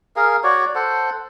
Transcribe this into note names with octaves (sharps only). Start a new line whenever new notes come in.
G#4 A#4 F5
F#4 C#5 D5
A4 C5 F#5